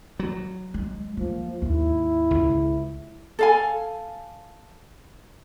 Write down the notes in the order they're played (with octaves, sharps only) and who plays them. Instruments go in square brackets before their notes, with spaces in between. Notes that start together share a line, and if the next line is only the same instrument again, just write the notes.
[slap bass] F#3
[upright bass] G#3
[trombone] F3 [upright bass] A#3
[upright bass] D#2 G#2 [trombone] E4
[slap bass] C#2
[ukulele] A4 F5 G#5